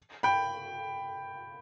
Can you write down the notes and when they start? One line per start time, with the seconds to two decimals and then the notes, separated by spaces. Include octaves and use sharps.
0.23 G5 B5